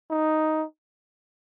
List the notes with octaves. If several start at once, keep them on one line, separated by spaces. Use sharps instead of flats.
D#4